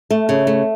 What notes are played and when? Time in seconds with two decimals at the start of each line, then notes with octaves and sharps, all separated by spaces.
0.10 A3
0.29 C#3
0.47 A3